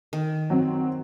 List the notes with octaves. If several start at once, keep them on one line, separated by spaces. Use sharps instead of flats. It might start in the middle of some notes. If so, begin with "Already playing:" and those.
D#3
F#3 C4